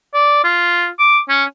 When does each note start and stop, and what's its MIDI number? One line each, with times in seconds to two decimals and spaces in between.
0.14 0.41 74
0.44 0.89 65
0.99 1.19 86
1.29 1.44 61